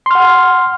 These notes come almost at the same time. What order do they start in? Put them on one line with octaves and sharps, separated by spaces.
C6 F6 F#5